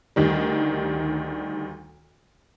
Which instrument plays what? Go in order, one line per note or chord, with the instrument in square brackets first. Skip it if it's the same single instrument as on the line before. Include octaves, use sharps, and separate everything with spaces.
[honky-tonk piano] D2 D#3 G3